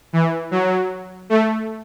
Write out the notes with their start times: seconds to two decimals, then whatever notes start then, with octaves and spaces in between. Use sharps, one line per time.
0.13 E3
0.51 F#3
1.30 A3